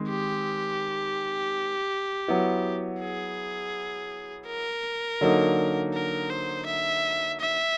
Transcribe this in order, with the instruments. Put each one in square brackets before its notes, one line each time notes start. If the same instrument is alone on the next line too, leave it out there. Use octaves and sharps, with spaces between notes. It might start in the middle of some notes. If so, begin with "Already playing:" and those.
Already playing: [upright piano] D#3 G#3 C4
[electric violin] G4
[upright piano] F#3 B3 E4
[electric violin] G#4
A#4
[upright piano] D3 F#3 A#3 D#4
[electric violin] A#4
C5
E5
E5